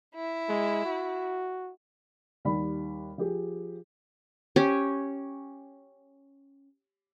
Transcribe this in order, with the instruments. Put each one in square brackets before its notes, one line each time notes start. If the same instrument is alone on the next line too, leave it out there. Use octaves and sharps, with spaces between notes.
[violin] E4
[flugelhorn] G#3
F#4
[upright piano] D#2 D#3 G3 D5 B5
F3 G4 G#4
[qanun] C#4 G4